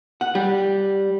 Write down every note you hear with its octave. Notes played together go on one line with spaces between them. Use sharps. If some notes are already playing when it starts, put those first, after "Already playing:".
F#5
G3